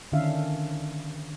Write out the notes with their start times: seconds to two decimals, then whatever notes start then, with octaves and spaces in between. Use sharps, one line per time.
0.12 D3 D#3 C#4 D4 E5 F5